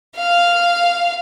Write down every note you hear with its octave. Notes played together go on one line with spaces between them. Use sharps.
F5